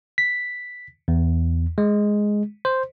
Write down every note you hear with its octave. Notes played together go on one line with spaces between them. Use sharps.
B6
E2
G#3
C5